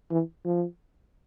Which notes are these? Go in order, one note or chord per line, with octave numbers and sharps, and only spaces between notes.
E3
F3